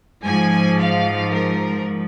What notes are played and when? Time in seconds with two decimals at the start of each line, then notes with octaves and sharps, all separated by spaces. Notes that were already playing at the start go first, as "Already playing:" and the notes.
0.23 G#2 F3 G#5
0.79 F5
1.34 A#4